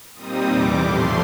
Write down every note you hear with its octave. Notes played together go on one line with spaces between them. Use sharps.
A#2 G3 C4 D#4 D#6
E2 C3 E3 G3 D6
A2 F3 A3 C6